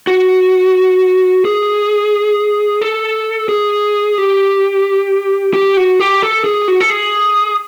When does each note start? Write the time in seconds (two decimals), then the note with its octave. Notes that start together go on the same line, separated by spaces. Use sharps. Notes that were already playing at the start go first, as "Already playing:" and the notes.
0.07 F#4
1.45 G#4
2.81 A4
3.49 G#4
4.18 G4
5.54 G4
5.77 F#4
6.00 G4
6.22 A4
6.44 G#4
6.68 F#4
6.80 A4
6.90 G#4